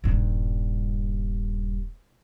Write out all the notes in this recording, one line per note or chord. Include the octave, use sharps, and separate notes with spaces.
D#1 G2